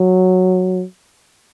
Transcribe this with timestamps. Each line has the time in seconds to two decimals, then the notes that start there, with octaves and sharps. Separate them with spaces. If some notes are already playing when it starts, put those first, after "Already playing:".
Already playing: F#3